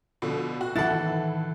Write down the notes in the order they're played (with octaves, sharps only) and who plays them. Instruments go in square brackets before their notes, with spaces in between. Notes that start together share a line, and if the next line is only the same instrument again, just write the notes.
[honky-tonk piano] B2 D3 F3
F#4
[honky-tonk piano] A2 A4 [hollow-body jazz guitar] D#3 E3 E4 [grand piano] F#5 A6